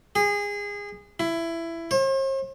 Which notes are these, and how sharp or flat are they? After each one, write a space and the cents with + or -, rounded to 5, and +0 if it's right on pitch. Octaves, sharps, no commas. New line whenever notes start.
G#4 -25
E4 +15
C5 +45